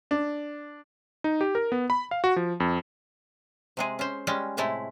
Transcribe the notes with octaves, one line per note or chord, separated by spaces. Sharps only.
D4
D#4
G4
A#4
B3
B5
F5
F#4
F3
F2
C3 G#3 G#4
C#4 C5
G3 G#3 C#4
A2 C3 G#3 A3 E4